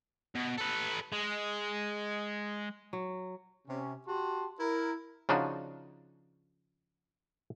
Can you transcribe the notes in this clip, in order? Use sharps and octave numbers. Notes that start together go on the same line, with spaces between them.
B2
A4 B4
G#3
F#3
C3 C#4
F#4 G4 A5 C6
E4 A#4
C#3 F3 D4 D#4 F#4